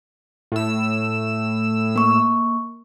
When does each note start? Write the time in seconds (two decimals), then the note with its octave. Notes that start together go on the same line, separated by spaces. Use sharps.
0.52 A2 E6
1.96 A#3 C#6